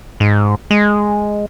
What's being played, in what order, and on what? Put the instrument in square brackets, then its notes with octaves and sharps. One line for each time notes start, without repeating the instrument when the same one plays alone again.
[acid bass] G#2
G#3